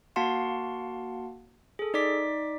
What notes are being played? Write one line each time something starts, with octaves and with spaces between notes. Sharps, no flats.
A#3 F#4 F5 F#5 A5 C6
G#4 A4
D#4 D5 D6 B6